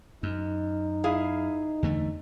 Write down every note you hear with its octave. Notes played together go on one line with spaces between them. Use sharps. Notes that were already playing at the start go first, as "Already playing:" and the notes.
F#2 D#4
E4 G#4 F5
E2 D3 A3